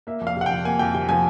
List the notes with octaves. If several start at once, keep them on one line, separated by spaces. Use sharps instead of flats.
A#3 E5
F2
F5
C3 F#5
F3 G5
A#3 G#5
F2 G5
C3 G5
F3 G#5